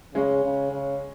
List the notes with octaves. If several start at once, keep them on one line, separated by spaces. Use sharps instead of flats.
C#3 G#3 C#4
C#3
C#3